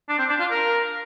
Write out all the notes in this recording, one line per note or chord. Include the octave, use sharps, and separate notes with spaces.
D4
C4
D4
F4
A#4